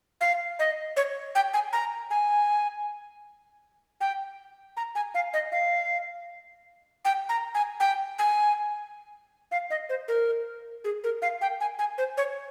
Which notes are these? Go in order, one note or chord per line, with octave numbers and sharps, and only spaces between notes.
F5
D#5
C#5
G5
G#5
A#5
G#5
G5
A#5
G#5
F5
D#5
F5
G5
A#5
G#5
G5
G#5
F5
D#5
C5
A#4
G#4
A#4
F5
G5
G#5
G#5
C5
C#5